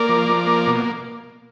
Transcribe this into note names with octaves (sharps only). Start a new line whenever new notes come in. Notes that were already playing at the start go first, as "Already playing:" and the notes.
Already playing: A#3 A#4 D5
F3
F3
A#3
B2